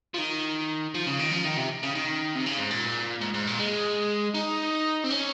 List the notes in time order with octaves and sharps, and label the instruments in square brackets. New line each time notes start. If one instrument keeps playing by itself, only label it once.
[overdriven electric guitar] F3
D#3
F3
C#3
D#3
F3
D#3
C3
C#3
D#3
C3
C#3
G#2
A#2
G#2
G#2
A#2
G#3
D#4
C4
C#4